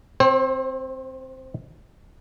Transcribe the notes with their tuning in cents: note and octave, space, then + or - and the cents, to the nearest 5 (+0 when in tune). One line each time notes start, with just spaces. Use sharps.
C4 +0 C5 +40